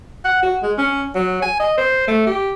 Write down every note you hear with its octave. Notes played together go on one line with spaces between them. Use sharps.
F#5
F#4
G#3
C#4
F#3
G#5
D#5
C5
A3
G4